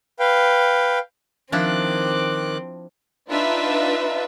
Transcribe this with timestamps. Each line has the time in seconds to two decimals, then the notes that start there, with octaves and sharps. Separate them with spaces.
0.19 B4 F5 G5
1.52 D#3 F3 C4 D4 E4 D6 F#6
3.29 D4 D#4 F4 B4 E5